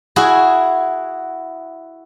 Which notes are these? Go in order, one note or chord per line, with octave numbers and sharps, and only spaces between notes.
E4 F#4 G#4